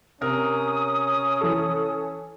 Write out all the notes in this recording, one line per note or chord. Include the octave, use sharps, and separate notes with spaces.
C3 C#4 A#4 D#6
E3 A4